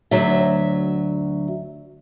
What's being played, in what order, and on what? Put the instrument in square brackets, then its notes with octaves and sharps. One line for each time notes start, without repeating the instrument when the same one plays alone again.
[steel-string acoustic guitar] D2 F#3 E5